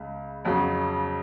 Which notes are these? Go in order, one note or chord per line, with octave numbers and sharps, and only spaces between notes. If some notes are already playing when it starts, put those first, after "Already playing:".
Already playing: C#2 C#3
F2 C#3 F#3